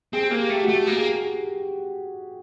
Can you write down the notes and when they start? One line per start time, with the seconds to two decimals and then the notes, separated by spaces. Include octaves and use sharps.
0.13 C4 G#4
0.31 A#3 G4
0.50 A3 G4
0.63 F#4
0.68 A3 G4
0.87 A#3
0.97 G#4